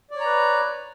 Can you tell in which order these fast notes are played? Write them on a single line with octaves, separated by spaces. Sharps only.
D5 C#5 A#5 B4